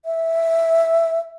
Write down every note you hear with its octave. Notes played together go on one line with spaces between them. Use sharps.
E5